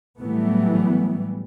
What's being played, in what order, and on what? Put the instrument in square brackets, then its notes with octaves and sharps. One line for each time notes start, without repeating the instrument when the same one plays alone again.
[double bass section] A2 E3 F#3 G3 A3 B3